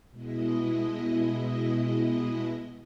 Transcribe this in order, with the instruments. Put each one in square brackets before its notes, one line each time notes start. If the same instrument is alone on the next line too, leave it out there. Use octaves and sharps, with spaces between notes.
[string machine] B2 G#3 E4 D#5